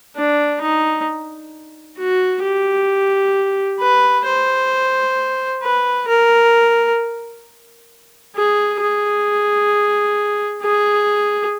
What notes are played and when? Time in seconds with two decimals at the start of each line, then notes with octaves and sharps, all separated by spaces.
0.16 D4
0.61 D#4
1.98 F#4
2.43 G4
3.80 B4
4.25 C5
5.62 B4
6.08 A#4
8.36 G#4
8.81 G#4
10.63 G#4